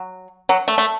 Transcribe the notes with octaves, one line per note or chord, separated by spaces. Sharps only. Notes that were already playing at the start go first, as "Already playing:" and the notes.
Already playing: F#3
F#3
A3
A3